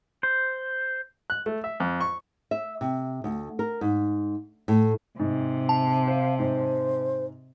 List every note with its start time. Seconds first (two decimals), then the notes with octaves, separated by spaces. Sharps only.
0.23 C5
1.30 F#6
1.46 A3
1.64 E5
1.80 F2
2.01 C#6
2.51 E5
2.81 C3
3.24 D2
3.59 A#4
3.81 G#2
4.68 A2
5.19 G#2 C3
5.69 A5
6.08 C5 F5
6.39 G#2 C5